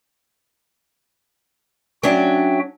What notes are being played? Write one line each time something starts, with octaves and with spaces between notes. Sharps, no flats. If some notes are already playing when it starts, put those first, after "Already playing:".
F#3 C#4 D4 F#4 E5 G5